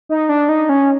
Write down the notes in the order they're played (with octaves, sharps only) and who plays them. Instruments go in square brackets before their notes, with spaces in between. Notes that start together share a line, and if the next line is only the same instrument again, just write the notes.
[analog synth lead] D#4
D4
D#4
C#4